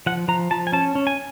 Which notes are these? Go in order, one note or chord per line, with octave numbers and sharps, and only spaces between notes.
F3 F#5
F3 A#5
F3 A5
G#5
C#4 A5
C#4
G#5